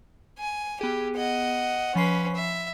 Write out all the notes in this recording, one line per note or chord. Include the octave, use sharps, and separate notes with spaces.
G#5
B3 G4 G#4
D#5 F#5
F3 C#4 B4 B5 C7
E5